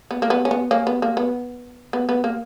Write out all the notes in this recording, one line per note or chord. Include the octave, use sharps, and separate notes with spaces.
B3
A#3
B3
C#4
B3
A#3 C#4
B3
A#3
B3
B3
B3
A#3